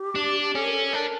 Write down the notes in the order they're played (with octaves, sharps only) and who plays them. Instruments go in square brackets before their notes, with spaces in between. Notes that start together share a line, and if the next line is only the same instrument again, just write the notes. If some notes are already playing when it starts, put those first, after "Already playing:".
Already playing: [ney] G4
[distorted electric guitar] D4
[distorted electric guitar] C#4 [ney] A4
[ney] A#4
A4
[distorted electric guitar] D4 [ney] A#4